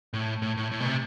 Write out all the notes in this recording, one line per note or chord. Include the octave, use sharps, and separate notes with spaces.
A2
A2
A2
A2
B2
C3